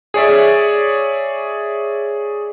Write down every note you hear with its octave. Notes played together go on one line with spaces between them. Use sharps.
G#4 C#5 D5 E5